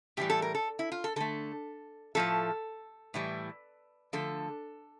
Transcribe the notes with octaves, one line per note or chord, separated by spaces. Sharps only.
A2 E3 G3 G4
A4
A#4
A4
E4
F4
A4
D3 A3 A4
A2 F3 A3 A4
A2 E3 G3
D3 F3 A3 A4